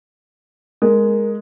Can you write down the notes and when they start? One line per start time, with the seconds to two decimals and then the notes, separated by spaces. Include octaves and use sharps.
0.82 G#3 A#4